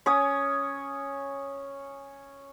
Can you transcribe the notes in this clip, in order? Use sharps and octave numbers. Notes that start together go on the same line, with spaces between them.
C#4 C#5 D#6